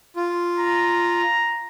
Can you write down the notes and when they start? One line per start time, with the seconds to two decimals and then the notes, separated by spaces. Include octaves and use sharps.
0.16 F4
0.57 A#5